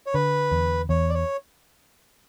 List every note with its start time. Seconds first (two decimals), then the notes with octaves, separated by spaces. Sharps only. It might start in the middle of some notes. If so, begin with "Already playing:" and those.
0.06 C#5
0.14 D3 B4
0.51 E2
0.89 E2 C#5
1.09 D5
1.14 C#5